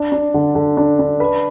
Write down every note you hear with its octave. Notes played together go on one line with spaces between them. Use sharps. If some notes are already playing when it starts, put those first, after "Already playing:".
Already playing: D4
D4
D3
D3
D4
D4
B4